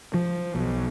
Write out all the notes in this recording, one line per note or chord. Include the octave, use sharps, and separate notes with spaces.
F3
B1